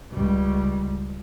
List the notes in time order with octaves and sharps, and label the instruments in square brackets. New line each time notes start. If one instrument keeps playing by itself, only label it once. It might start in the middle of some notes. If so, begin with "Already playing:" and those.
[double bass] C#2 G3